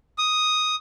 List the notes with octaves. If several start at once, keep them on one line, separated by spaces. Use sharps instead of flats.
D#6